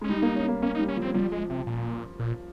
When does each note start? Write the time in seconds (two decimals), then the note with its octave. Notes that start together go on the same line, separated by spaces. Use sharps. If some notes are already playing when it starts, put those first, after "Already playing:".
0.01 G#3 C#4
0.09 G3 D#4
0.22 A#3
0.36 C#4
0.48 A#3
0.62 A#3 C#4
0.75 D#4
0.79 G3
0.88 C#4
0.97 F3 C4
1.14 F3 G3
1.32 G#3
1.50 C3
1.67 A#2
2.19 A#2